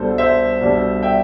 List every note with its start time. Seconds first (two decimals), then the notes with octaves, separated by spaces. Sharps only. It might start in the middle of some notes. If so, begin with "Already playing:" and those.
Already playing: C2 B2 G3 D4 A4 C5
0.18 C5 E5
0.61 C2 B2 G3 D4
1.03 E5 G5